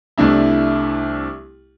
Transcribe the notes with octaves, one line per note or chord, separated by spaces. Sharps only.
C2 A3 D4 E4